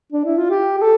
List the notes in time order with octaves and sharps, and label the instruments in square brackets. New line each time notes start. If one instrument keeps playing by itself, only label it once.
[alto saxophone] D4
E4
F4
G4
G4
A4